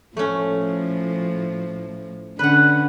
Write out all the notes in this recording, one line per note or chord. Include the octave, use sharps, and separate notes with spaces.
A2 F3 A3 C#4
D3 C#4 B4 F#5